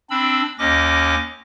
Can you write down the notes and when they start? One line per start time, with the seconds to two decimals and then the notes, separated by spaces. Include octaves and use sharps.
0.10 C4 D4 B5 E6
0.59 D#2 C#4 D#5 D6 A#6